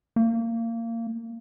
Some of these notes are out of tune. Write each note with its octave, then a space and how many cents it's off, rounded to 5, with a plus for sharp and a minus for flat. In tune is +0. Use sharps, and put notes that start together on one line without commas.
A#3 -25